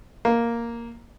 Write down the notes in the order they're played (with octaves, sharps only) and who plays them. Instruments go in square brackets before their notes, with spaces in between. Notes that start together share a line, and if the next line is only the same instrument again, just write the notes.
[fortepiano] A#3